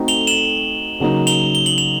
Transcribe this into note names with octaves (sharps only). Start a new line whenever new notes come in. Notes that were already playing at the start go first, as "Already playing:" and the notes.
Already playing: A3 C4 D#4 F#4 A4
F7 G7
E7 F#7
C#3 F#3 A#3 D#4
F7 G7
G7
F#7
F7